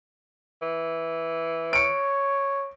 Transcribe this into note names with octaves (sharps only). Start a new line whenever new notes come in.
E3
C#5 C#7 D7